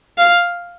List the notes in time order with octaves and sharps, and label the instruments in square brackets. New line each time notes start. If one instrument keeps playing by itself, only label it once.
[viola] F5